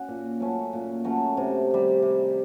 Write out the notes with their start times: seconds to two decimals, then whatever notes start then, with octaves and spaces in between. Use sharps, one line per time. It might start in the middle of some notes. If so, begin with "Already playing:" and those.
Already playing: C#4 F#4
0.08 A#2
0.40 F#3 A3 C#4
0.73 A#2
1.05 F#3 A3 C#4
1.37 C3
1.71 D#3 G3
2.02 C3